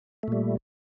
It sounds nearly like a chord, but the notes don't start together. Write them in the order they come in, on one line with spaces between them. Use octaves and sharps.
A3 A#2 G3